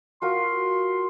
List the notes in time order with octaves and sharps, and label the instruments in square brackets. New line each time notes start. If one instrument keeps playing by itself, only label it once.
[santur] F4 F#4 A#4 [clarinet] C6